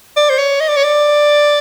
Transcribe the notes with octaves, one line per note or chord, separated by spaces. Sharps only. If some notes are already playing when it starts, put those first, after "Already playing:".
D5
C5
C#5
D#5
D5
C#5
D5